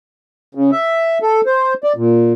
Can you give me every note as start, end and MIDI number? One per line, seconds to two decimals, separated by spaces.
0.55 0.71 49
0.72 1.18 76
1.22 1.41 69
1.46 1.74 72
1.84 1.93 74
1.97 2.33 46